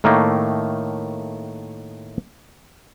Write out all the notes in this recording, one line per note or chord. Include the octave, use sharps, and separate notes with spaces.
A2 D#3 A3 A#3